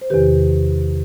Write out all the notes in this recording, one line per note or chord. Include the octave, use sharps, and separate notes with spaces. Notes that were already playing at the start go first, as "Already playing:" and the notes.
C5
E2 C3 D#3 G4 B4